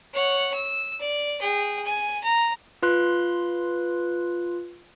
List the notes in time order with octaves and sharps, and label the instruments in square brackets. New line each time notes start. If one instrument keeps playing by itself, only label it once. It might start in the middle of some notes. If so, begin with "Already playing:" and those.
[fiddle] C#5 F#5
E6
D5
G#4 G5
G#5
A#5
[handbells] F4 B4 C6 F#6